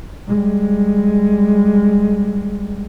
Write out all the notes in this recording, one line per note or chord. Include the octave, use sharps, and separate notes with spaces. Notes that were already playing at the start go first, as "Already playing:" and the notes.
G3 G#3